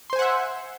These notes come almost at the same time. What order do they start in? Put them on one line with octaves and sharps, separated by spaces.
C6 C5 G#5 F#5 E5